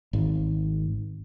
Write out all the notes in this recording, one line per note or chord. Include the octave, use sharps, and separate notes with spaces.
G#1